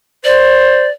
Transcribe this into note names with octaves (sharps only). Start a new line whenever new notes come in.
C5 D5